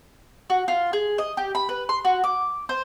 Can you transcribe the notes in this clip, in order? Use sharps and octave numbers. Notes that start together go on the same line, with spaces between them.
F#4
F4
G#4
D#5
G4
B5
B4
C6
F#4
D6
C5